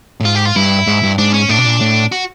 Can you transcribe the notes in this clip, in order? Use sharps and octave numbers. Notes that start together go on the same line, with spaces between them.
A2
G#2 F4
G4
F4
G2 E4
G#2
G2
G#2 D4
C#4
A2 D4
B2
A#2
A2
F#4